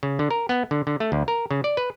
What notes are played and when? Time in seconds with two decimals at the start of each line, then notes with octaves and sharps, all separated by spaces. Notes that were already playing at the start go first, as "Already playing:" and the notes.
0.03 C#3
0.19 D3
0.31 A#4
0.49 B3
0.71 D3
0.87 D3
1.00 A3
1.12 D2
1.28 A#4
1.51 C#3
1.64 D5
1.77 B4